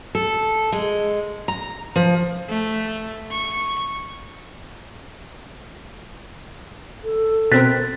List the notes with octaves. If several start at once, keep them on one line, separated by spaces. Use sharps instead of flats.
A4
G#3
A#5
F3
A3
C#6
A4
B2 C4 A#4 F#6 A6 B6